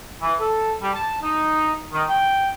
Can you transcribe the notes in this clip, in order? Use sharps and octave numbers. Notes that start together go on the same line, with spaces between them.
E3
A4
G3
A5
D#4
D#3
G5